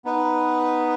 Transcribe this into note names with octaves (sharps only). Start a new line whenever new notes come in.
B3 D#4 B4